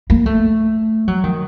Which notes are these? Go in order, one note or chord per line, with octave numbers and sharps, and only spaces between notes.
A#3
A3
F#3
D#3